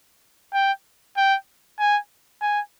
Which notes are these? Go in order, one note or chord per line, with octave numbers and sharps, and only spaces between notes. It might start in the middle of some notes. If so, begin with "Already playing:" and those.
G5
G5
G#5
G#5